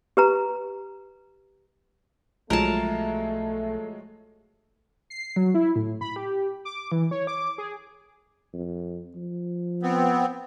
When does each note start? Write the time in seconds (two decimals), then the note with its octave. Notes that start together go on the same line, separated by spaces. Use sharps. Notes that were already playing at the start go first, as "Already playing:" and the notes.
0.17 G4 B4 A#5
2.50 B1 F3 F#3 G#3 A3 A#4 A5
5.10 C7
5.36 F#3
5.55 E4
5.76 A2
6.01 B5
6.16 G4
6.65 D6
6.92 E3
7.11 C#5
7.27 D6
7.58 G#4
8.54 F2
9.16 F3
9.83 B3 C4